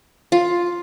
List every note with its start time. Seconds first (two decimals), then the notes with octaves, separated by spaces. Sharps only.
0.32 F4